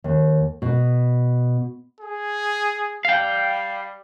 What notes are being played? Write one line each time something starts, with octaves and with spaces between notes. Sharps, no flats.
D#2
B2
G#4
G3 F5 G5